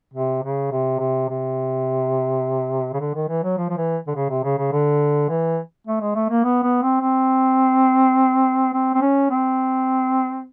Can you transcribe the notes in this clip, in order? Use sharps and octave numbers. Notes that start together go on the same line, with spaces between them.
C3
C#3
C3
C3
C3
C#3
D3
D#3
E3
F#3
F3
F3
E3
D3
C#3
C3
C#3
C#3
D3
E3
A3
G#3
A3
A#3
B3
B3
C4
C4
C4
C4
C#4
C4